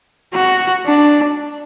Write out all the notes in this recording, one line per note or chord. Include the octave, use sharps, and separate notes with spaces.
F#4
D4